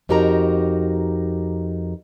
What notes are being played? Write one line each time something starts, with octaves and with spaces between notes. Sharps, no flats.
F2 D#4 F#4 G4 A#4 A#5